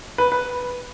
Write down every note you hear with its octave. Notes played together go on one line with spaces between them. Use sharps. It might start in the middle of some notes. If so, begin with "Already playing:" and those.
B4
B4